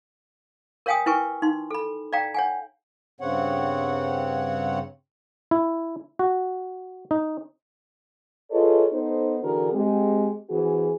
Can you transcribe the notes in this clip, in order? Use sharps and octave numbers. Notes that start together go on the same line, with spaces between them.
A#4 C#5 F5 G5 G#5 D#6
E4 A#4 B4 G5 G#5 C#6
D#4 C6
A4 B5
D5 F5 G5 A#5
C#5 F#5 G#5
G2 C#3 C4 C#5 F#5
E4
F#4
D#4
F4 G#4 A4 B4 C#5 D#5
B3 D#4 A4 C5
D3 E3 D4 F#4 G#4 A#4
G#3 C4 G4
E3 C4 F#4 G#4